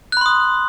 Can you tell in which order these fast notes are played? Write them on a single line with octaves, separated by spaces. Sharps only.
F#6 B5 C6 D#6